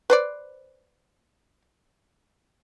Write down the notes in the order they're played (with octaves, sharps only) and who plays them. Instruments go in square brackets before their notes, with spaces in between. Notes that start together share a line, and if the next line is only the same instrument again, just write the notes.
[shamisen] B4 C5 D5